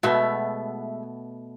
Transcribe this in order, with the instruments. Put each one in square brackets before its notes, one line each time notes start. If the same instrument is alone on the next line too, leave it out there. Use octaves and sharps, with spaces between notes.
[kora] B2 A3 B3 [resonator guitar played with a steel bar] G#3 E5